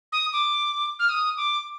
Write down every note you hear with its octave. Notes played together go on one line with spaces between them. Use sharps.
D#6
D6
F6
D#6
D6